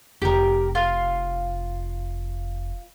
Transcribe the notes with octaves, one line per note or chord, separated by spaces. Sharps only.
F1 G4 A#4
F4 F5